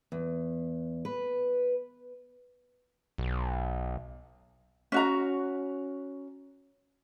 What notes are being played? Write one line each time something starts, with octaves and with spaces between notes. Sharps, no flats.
E2
B4
B1
C#4 F#4 A#5